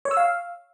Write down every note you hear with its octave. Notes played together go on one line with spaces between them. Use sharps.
C#5
E6
F5